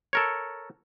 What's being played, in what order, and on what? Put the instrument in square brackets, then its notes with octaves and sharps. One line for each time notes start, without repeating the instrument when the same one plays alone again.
[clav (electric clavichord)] A4 A#4 C#5